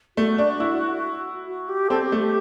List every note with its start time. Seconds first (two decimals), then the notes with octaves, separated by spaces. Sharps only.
0.17 A3 F#4
0.38 D4
0.60 E4
1.47 F#4
1.69 G4
1.90 C4 A4
2.04 G4
2.12 A3
2.19 G4